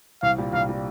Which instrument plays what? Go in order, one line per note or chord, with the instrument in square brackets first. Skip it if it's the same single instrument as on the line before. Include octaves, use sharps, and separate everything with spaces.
[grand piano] C2 [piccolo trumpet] F5
[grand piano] A#2 G3
[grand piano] C2 [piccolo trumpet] F5
[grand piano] A#2 G3